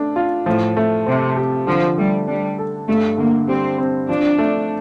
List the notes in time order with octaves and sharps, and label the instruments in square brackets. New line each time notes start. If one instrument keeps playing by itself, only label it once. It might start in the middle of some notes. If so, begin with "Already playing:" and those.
Already playing: [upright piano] A3 D4
F4
[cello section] A2 [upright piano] F3
[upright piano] A3
[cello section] C3 [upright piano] C4
[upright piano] G4
[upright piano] D3 [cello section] F3
[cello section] G3 [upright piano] A3
[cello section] G3 [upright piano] D4
[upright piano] A4
[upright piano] G2 [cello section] A3
[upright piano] D3 [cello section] A#3
[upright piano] G3 [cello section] C4
[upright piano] C4
[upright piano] F3 [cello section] D4
[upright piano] A3